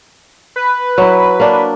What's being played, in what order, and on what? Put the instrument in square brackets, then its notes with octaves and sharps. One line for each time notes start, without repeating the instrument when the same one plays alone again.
[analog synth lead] B4
[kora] F#3 E4
A#3 D4